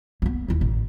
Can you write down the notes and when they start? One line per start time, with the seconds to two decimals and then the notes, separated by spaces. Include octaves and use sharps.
0.22 A#3 B3
0.48 D#2 E4
0.61 A1